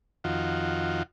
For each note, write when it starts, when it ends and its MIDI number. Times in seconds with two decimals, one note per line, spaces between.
0.24 1.03 41
0.24 1.03 51
0.24 1.03 65
0.24 1.03 66